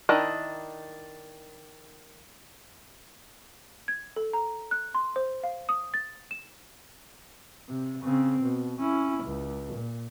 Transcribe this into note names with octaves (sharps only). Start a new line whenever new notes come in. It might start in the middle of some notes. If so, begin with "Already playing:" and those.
D#3 D4 E4 D#5
G#6
A4
A#5
F#6
C6
C5
F5
D#6
A6
E7
C3
C#3 C4
B2
C#4 E4
C#2
A#2